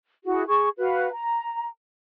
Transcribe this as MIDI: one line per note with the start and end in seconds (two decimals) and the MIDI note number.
0.25 0.43 64
0.25 0.43 66
0.25 0.43 68
0.47 0.69 68
0.47 0.69 85
0.78 1.09 66
0.78 1.09 71
0.78 1.09 77
1.11 1.67 82